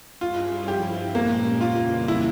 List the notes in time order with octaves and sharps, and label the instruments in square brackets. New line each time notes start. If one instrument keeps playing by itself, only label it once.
[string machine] G2 G3 C#4 E4 G#4 [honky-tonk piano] F4
[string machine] G2 F3 C4 E4 [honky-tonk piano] G4
[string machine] A#2 G#3 C#4 G4 [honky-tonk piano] A#3
[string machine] F2 C#3 E3 G3 A#3 [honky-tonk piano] F4
[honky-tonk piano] E4